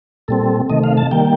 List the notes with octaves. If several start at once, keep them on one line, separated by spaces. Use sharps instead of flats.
A#2 G3 C4 A4
C3 D#3 A3 D#5
F5
A5
D#3 G3 A#3 G5